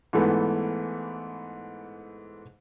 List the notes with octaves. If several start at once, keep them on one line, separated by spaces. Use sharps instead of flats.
G#2 E3 A3 B3